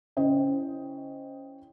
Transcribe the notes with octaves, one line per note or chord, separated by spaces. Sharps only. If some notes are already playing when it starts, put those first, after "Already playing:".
C#3 E4 C5 D#5 G5